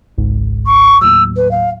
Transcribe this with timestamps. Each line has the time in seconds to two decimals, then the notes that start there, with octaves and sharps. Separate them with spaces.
0.18 G#1 C#2 G#2
0.66 C#6
1.01 D#2 A2 F#3 E6
1.36 B4
1.51 F5